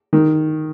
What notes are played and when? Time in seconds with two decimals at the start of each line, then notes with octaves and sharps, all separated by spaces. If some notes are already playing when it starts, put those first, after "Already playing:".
0.13 D#3